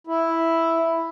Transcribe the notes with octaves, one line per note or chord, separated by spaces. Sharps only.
E4